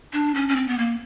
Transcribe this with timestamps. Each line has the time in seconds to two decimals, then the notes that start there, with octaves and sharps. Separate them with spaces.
0.13 D4
0.35 C#4
0.49 C#4
0.56 C4
0.68 B3
0.78 A#3